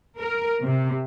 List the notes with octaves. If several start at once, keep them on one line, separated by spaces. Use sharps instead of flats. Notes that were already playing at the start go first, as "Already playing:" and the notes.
A#4
C3